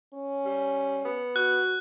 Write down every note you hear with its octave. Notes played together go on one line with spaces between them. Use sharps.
C#4
G3
B3
F#4 F#6